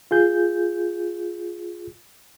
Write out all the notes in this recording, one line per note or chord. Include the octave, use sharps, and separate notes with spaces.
F4 G#4 G6